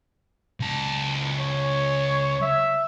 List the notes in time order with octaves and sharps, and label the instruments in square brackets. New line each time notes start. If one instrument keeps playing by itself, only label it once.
[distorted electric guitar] C#2 A5
[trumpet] C#5
E5